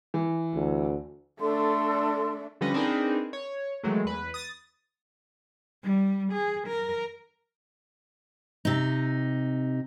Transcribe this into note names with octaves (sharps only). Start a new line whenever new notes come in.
E3
D2
A3 D4 A4 C6
D3 F3 G3 C#4 B4 D#5
C4 D4 D#4 G#4 A#4 B4
C#5
D#3 E3 F#3 G#3 A3
E2 B4
D#6 A6
G3
G#4
A#4
C3 D#4